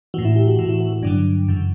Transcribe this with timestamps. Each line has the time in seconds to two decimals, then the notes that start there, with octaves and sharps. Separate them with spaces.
0.14 A2 E3 F#4
0.25 E4
0.36 G4
0.48 F#4
0.59 A2 E3 E4
0.65 F#4
0.69 E4
0.80 F#4
0.93 F#4
1.03 G2 D3 F#3 D4
1.48 F#2 C#3 E3